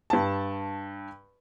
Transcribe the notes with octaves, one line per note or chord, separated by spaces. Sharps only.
G2 A5